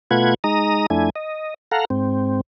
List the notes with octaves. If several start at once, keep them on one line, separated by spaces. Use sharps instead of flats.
B2 A3 F4 B4 F#5 G#6
G#3 D#4 A#5 D#6
F2 A3 D4 E4 G#5
D#5
A4 F5 F#5 A#5
G#2 C4